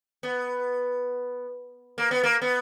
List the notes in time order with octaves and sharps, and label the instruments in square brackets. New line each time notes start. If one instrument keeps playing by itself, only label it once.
[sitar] B3
A#3
B3
A#3
B3